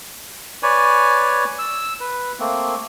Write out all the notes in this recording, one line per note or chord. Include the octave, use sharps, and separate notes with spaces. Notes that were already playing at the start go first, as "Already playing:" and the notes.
B4 C#5 D5 G#5
E6
B4
A3 A#3 C4